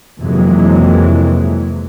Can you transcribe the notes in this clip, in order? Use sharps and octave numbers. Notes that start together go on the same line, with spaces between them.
F2 C3 E3 F#3 G#3 A#3